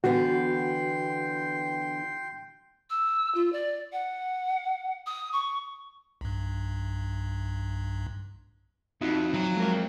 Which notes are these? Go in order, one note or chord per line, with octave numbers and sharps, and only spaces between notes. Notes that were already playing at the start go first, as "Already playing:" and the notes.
D3 E3 B3 F#4 G5 C6
E6
F4
D5
F#5
D#6
C#6
B1 G2
F2 D#4 E4 F#4
F#3
G#3 A#4